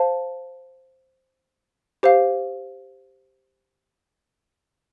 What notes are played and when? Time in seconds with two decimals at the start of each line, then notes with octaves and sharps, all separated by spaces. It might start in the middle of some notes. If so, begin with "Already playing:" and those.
Already playing: C5 F5 A5
2.03 G4 C5 F5